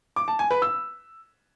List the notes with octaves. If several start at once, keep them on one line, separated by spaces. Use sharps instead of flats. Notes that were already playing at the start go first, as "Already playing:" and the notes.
D6
A5
G#5
B4
E6